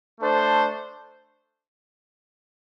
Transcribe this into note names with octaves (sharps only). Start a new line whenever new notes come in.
A3 D4 A4 C5